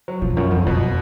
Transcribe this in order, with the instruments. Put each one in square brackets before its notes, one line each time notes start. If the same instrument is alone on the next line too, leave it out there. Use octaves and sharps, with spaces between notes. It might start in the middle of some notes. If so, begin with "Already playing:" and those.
[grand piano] F#3
[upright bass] B2 [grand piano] F3
[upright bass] F2
[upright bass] F#2 [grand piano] F3
[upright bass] F2 [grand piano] F3
[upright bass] F2 [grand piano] B2